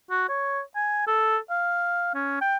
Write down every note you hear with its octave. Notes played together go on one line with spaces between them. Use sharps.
F#4
C#5
G#5
A4
F5
C#4
G5